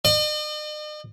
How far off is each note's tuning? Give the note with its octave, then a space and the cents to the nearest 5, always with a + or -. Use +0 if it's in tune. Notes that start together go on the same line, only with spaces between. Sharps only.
D#5 -45